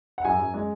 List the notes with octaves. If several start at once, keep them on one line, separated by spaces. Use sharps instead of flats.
F#5
F#2 G#5
F#2
G#3